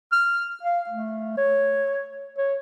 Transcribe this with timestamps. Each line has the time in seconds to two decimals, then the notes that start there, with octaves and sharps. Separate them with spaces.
0.12 F6
0.63 F5
0.89 A3
1.37 C#5
2.38 C#5